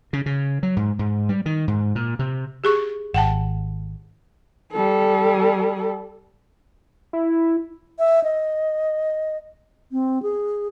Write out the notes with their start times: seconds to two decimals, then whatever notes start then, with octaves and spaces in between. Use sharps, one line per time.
0.13 C#3
0.26 C#3
0.63 F#3
0.77 G#2
0.99 G#2
1.29 G3
1.46 D#3
1.68 G#2
1.95 A#2
2.19 C3
2.64 G4 G#4 C#6
3.14 G#1 F#5 G5 A5
4.73 G3 A4
7.13 E4
7.98 E5
8.23 D#5
9.92 C4
10.23 G#4